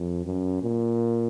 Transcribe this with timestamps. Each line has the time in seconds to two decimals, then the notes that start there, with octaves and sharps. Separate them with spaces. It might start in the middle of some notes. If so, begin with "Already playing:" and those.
Already playing: F2
0.26 F#2
0.63 A#2